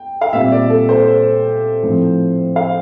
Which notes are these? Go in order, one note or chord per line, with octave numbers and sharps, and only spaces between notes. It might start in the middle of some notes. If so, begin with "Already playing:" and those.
Already playing: G5
F5
A#2 G3 C4 E5
D5
A4
C5
A2 F3 C4
F5